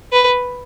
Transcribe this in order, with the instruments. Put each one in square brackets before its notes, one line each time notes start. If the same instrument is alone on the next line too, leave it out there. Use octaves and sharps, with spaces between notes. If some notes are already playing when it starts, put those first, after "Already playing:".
[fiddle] B4